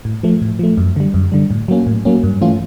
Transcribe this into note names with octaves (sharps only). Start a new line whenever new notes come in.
A2
F3 A3
A2
F3 A3
F#2
D3 G3
F#2
D3 G3
A2
F#3 A#3 C#4
A2
F#3 A#3 C#4
G2
E3 A3 C#4 F4